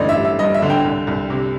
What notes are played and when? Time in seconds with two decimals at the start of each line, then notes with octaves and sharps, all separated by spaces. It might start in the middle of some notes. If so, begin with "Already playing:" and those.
Already playing: A1 G2 D3 D5 D#5
0.09 E5
0.17 G3
0.25 E5
0.39 G2 D#5
0.54 E5
0.62 D3
0.70 G5
0.84 C2
1.07 C2
1.30 C3